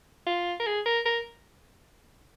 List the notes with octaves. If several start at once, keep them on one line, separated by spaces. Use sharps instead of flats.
F4
A#4
G#4
A#4
A#4